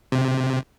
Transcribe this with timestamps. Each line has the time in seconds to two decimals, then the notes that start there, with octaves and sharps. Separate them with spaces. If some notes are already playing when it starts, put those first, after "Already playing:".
0.12 C3